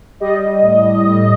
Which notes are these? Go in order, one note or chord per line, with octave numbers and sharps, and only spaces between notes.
G3 D#5
G3
A2
G3
G3